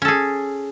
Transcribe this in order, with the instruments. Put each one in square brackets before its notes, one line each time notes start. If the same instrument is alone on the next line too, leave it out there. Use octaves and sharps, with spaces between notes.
[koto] C#4
A4
G#4